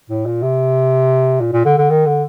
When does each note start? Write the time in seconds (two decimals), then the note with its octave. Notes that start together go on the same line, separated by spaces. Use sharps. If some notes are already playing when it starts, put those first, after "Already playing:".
0.10 A2
0.26 A#2
0.42 C3
1.41 A#2
1.53 A#2
1.65 D3
1.78 D3
1.90 D#3
2.06 D3